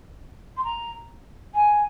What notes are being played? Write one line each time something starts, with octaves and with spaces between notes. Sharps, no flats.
C6
A#5
G#5